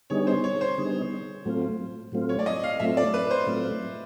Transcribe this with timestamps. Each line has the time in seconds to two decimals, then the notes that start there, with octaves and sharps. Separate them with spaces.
0.10 D3 G3 B3 D#4 G#4 C#5
0.27 C5
0.44 C#5
0.61 C5
0.78 D3 G3 B3 D#4 G#4
1.45 A2 F#3 A3 C4 F4
2.12 A2 F#3 A3 C4 F4
2.29 C#5
2.39 D5
2.46 D#5
2.64 F5
2.80 A2 F#3 A3 C4 F4 E5
2.97 D5
3.14 B4
3.31 C5
3.47 A2 F#3 A3 C4 F4